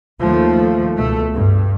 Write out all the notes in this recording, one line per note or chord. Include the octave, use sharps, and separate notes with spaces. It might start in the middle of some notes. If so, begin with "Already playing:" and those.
D#2 F3 A3
C#2 B2 A3
G2